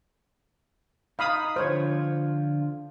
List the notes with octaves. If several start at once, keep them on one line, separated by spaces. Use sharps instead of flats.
D#4 F5 B5 D#6
D3 F3 F4 C5 C#5